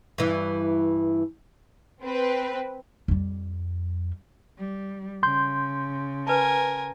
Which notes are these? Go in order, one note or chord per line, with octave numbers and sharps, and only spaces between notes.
G2 E3
C4 B4
F2 G3
G3
C#3 C6 G6
A#4 B4 G#5 A5